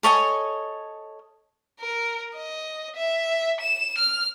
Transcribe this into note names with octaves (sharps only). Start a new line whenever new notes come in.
A4 C#5 D#5 G#5
A#4
D#5
E5
E7
F6